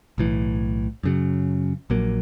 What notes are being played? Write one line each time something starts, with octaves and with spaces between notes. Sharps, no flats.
B1 A2 E3
F#2 C#3 F#3
A#1 A#2 F#3 A#3